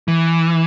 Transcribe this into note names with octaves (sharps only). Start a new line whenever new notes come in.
E3